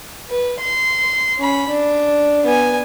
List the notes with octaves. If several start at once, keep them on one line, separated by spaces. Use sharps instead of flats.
B4
C6
C#4 B5
D4
B3 G#5